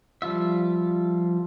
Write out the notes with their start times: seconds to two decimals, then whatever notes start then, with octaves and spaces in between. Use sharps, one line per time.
0.22 F3 G3 F4 E5